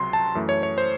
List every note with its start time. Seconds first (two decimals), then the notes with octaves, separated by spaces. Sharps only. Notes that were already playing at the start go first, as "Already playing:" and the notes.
Already playing: C#2 C3 F#3 C6
0.13 A5
0.35 F#2 E3 A3
0.49 C#5
0.63 C#5
0.78 C5